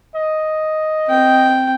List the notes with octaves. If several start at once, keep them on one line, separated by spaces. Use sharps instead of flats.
D#5
C4 G5